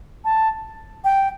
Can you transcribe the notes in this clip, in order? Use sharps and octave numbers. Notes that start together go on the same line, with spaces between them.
A5
G5